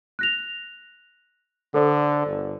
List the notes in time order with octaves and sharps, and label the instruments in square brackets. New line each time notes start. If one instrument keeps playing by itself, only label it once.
[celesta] F#6 A#6 F7
[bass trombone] D3 [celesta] A4 C5 D5
[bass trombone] G1